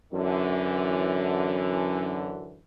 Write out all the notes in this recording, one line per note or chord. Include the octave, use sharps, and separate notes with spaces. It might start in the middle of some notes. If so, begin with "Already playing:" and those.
F#2 D3 E3